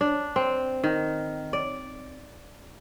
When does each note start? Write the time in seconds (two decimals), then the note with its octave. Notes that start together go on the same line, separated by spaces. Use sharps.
0.01 D4
0.36 C4
0.84 D#3
1.53 D5